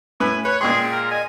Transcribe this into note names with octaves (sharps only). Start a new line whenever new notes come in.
A2 B4 G#5
B4 C#5 F#6
A#2 G#3 G#4 G5 C6
A#4
D#5 G#5